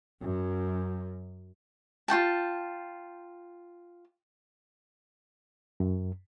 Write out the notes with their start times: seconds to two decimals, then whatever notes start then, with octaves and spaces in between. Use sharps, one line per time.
0.22 F#2
2.08 F4 F#4 G5 A5
5.80 F#2